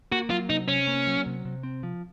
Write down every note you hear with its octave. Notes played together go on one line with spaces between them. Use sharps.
A#3 F#4
F#3 F4
C3 D#4
C3 C#4
A#3
F#3
C3
C3
C4
F3